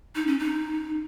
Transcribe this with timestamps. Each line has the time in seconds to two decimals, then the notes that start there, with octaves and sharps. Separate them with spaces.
0.15 D#4
0.27 C#4
0.39 D#4